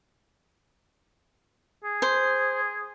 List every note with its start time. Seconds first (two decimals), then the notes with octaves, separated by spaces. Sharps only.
1.84 G#4
2.02 C5